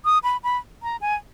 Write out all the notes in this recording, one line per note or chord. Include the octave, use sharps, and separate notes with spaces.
D#6
B5
B5
A#5
G#5